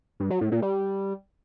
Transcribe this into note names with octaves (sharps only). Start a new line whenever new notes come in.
G2
F#3
A2
A#2
G3